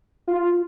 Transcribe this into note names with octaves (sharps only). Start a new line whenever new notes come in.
F4